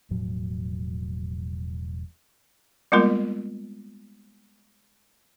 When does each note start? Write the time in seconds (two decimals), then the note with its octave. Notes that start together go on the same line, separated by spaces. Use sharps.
0.11 E1 A2 F3 F#3
2.92 G3 G#3 A#3 B3 F4 A#4